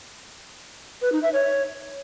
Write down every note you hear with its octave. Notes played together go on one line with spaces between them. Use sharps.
B4
D#4
E5
C#5